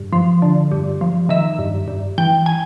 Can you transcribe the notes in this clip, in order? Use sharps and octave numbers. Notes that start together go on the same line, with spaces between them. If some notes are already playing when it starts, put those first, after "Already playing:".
Already playing: G2
F3
D3
G2
F3
D#3 E5
G2
G2
E3 G5
G#5